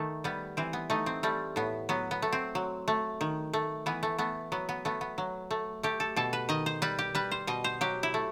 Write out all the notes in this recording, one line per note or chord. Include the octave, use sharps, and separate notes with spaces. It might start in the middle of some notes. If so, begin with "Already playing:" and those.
Already playing: D#3 A3
G3 B3
E3 C4
B3
A3 D#4
C4
G3 A3
A2 B3
F#3 B3
B3
A3
C4
F#3
A3
D#3
A3
E3 B3
A3
A3 B3
F#3 B3
B3
A3 B3
B3
F#3
A3
A3 G4
A4
B2 A4
B4
D#3 D#5
C5
G3 B4
G4
G3 B4
C5
B2 D#5
C5
F#3 G4
E4
A3